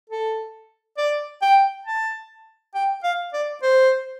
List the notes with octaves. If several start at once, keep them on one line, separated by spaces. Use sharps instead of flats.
A4
D5
G5
A5
G5
F5
D5
C5